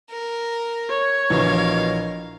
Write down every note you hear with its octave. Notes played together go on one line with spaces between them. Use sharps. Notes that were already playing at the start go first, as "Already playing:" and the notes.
A#4
C#5
A#1 B2 E3 A#4 F5